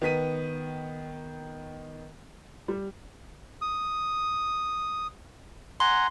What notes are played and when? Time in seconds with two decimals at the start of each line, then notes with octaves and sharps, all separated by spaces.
0.02 D#3 B3 B6 D#7
2.68 G3
3.61 D#6
5.80 F#5 G#5 A#5 C6